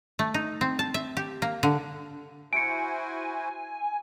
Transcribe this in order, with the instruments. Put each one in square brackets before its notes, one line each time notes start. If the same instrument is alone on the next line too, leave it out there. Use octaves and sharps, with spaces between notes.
[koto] A3
D#4
C4
A5
E5
G4
A#3
D3
[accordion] E4 F#4 C5 [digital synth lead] G#5 [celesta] C#7 D7